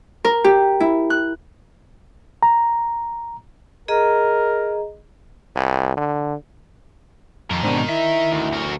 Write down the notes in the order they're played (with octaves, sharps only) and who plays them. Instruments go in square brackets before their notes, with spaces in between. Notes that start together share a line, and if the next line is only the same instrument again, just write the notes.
[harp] A#4
G4
E4
F#6
[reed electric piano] A#5
[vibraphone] G#4 D#5 A#5 [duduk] A#4
[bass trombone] C2
D3
[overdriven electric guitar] F2 [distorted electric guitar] D#4 A#4
[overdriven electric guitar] G#2 B2 [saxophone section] D#3 C4 D4
[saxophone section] E4 [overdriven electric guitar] E5
[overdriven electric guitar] D2
[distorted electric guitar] F#4 A#4